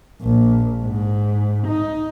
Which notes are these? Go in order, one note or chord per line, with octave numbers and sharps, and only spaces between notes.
A#1
G#2
D#4